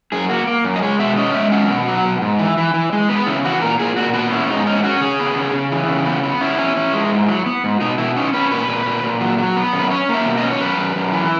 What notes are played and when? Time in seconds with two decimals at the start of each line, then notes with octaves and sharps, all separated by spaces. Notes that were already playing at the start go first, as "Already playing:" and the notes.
0.12 F#2 G#4
0.29 A#3 F#4
0.47 A#3
0.64 F#2
0.76 D#5
0.82 G#3 C#5
0.99 B2 E5
1.17 C#4 D#5
1.34 G#3 E5
1.52 C#4 F#5
1.70 B2
1.88 F#3
2.05 B2
2.21 G#2
2.39 E3
2.57 E3
2.74 E3
2.92 G#3
3.09 B3 B4
3.26 C#3 E4
3.44 E3 F#4
3.61 A#2 A#4
3.79 A#2 G#4
3.96 A#2 F#4
4.14 B3 F#4
4.31 C#4 E4
4.49 G#2 D#4
4.67 C#4 D#4
4.77 E4
4.83 C#4 F#4
5.01 C#3 G#4
5.20 B3
5.36 C#3
5.54 C#3
5.72 E3
5.88 C#3
6.06 B3
6.23 B3
6.41 C#4 E4
6.58 C#4
6.76 C#4
6.93 G#3
7.11 G#2
7.29 F#3
7.46 B3
7.64 G#2
7.80 B2 D#4
7.98 B2 E4
8.16 C#4 D#4
8.33 C#4 B4
8.51 A#2 B4
8.68 A#2
8.86 A#2
9.03 A#2
9.21 F#3
9.38 F#3
9.56 B3
9.73 F#2
9.79 B4
9.91 C#4 C#5
10.09 A#3
10.14 E5
10.25 B2
10.37 D#5
10.42 C#4
10.52 C#5
10.61 F#2 B4
10.78 F#2
10.96 F#2
11.13 E3